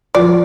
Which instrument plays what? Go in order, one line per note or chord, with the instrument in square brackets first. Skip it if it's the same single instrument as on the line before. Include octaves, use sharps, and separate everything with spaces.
[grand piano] F3 [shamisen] D5